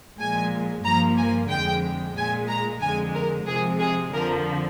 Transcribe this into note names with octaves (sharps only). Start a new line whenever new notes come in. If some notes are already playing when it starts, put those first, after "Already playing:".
A#2 F3 G#3 G#5
G2 F3 A#3 A#5
G#5
F2 D3 G#3 G5
A#2 G#3 G#5
A#5
F2 D3 G#3 G#5
A#4
C3 F3 G#3 G#4
G#4
F2 D3 F3 A#4